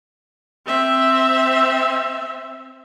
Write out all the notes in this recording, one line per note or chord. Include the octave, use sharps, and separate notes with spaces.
C4 E5